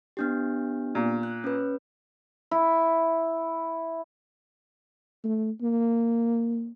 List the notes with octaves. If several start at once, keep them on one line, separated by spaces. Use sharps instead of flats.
B3 D4 G4
A#2
F#6
C#4 B4
E4
A3
A#3